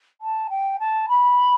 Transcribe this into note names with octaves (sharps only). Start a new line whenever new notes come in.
A5
G5
A5
B5